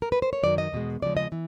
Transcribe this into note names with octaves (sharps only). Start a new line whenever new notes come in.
A#4
B4
C5
C#5
F#2 D#3 F#3 D5
D#5
E2 B2 G#3
D#2 C#3 F3 G#3 D5
D#5
E3